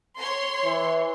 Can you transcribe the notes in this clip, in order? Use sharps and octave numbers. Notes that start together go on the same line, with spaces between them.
C#5 C6
E3